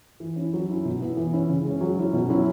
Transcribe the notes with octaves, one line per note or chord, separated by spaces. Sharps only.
E3
C#4 E4
F#3
C#4 E4
B2
B3 E4
E3
C#4 E4
C#3
G#3 C#4
F#3
C#4 E4
B2
F#3 C#4 E4